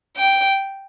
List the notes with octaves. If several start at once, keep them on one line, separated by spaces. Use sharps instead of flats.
G5